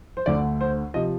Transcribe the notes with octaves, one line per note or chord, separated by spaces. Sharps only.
C5
D2 D3 A3 D5
C5
C3 F3 D#5